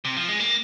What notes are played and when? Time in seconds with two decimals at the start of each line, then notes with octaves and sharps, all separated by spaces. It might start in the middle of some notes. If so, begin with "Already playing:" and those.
0.05 C3
0.17 F3
0.28 G#3
0.40 A#3